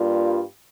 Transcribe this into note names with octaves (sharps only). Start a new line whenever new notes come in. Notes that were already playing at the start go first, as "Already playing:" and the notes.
Already playing: G2 G3 A#3 F4